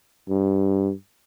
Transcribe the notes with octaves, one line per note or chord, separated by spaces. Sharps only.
G2